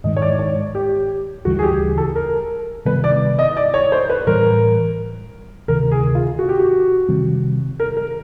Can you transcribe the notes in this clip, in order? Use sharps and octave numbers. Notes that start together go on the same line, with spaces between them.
G#2 D#3 G#3 D#5
C#5
D5
C#5
G4
D2 C#3 E3 G3 F#4
G#4
G4
A4
A#4
C3 D#3 G3 B3 B4
D5
D#5
D5
C#5
C5
B4
A2 E3 G3 A#4
D2 C3 D#3 A#4
G#4
F4
F#4
G4
F#4
C3 D#3 G3 C4
A#4
A#4